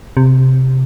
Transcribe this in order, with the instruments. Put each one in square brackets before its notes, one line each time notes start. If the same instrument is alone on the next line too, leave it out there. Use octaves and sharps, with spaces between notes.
[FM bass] C3